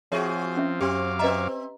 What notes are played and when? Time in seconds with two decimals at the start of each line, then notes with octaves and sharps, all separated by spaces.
0.12 F3 C4 F#4 G#4 C#5 E5 C#6
0.57 C#4 E5
0.81 F#2 C4 G4 F5 G5 C6 D6
1.19 C4 B4 D#5 E5 A#5